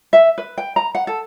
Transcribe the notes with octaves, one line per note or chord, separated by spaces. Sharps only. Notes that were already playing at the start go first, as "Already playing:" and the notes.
E5
B4
G5
A#5
F#5
A4